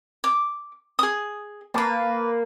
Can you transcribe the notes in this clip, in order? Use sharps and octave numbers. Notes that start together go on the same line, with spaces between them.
D6
G#4 D#6
A#3 B4 A5